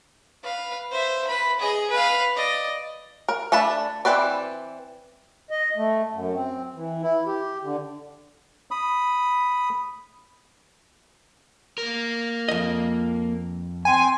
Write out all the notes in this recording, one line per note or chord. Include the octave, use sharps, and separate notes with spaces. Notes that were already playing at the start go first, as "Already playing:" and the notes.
B4 F5
C5 E5
B4 B5
G#4 D#5
B4 F5
D5 D#5
A#4
A3 D4 A5 B5
E3 C4 B4 D5
D#5
A3
F#2
C4
E3
E4
G4
D3
B5 D#6
A#3 A#4
F2 D#5
C4 G#5